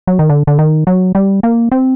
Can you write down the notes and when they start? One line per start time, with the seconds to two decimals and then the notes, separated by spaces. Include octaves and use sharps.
0.07 F#3
0.19 D#3
0.29 D3
0.47 D3
0.59 D#3
0.87 F#3
1.15 G3
1.43 A#3
1.72 C4